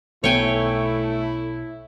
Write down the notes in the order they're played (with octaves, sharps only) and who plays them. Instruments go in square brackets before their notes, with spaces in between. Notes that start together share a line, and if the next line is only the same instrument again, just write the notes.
[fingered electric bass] B1 B3 [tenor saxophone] A3 [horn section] E4 [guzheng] C#5 G5 G#5